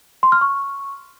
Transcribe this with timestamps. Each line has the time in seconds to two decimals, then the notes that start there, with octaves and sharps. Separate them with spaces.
0.23 C6
0.32 F6
0.41 C#6